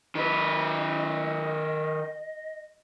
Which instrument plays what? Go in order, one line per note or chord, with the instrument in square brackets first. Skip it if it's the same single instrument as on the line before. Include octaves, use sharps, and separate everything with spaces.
[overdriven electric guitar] D#3 B4 [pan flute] D#5